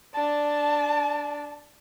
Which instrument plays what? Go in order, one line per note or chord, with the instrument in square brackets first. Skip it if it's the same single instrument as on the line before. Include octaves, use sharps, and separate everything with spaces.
[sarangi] D4 [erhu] A5